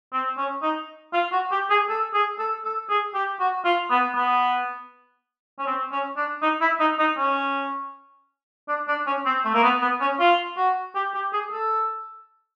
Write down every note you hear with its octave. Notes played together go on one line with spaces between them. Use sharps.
C4
C#4
D#4
F4
F#4
G4
G#4
A4
G#4
A4
A4
G#4
G4
F#4
F4
B3
B3
C#4
C4
C#4
D4
D#4
E4
D#4
D#4
C#4
D4
D4
C#4
C4
A3
A#3
B3
B3
C#4
F4
F#4
G4
G4
G#4
A4